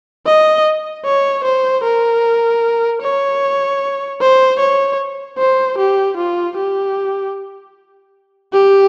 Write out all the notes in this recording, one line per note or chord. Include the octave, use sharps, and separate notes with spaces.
D#5
C#5
C5
A#4
C#5
C5
C#5
C5
G4
F4
G4
G4